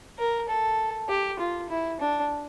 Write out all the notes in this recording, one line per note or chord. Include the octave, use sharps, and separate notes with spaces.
A#4
A4
G4
F4
E4
D4